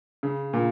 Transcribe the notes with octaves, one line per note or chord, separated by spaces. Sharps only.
C#3
A#2